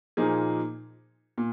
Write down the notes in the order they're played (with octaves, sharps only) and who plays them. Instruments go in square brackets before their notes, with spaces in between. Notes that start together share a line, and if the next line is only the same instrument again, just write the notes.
[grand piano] A#2 F3 A#3 D#4 G#4
A#2